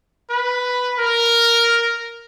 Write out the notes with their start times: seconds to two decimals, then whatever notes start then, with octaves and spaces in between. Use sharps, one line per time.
0.30 B4
0.99 A#4